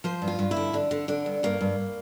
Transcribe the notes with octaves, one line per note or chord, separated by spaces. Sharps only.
F3 C5
G2
F4
G2
E4
D3
D3 D4
D3
D3 D4
G2
G2 A#3
G2